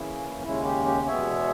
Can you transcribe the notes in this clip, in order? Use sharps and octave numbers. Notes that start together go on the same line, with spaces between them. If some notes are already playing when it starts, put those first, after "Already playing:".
Already playing: C#3 E3 A#3 C#4 E4 G#4
D#2 C#3 G#3 C#4 E4
G4
G4
E2 B2 G#3 B3 C#5 E5